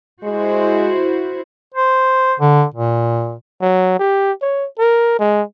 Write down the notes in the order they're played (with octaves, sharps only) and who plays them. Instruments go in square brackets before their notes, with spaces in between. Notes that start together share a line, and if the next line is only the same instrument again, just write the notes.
[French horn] G#3 [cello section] E4 F#4 C5
[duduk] C5
D3
A#2
[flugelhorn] F#3
G4
C#5
A#4
G#3